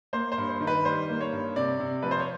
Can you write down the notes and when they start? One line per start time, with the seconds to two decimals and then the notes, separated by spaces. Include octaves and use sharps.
0.13 A#3 C5
0.32 C5
0.38 G2
0.49 C5
0.60 D#3
0.67 B4
0.85 G3 C5
1.09 A#3
1.21 C#5
1.32 G2
1.56 C3 D5
1.80 C3
2.03 F3 B4
2.11 C5
2.20 C#5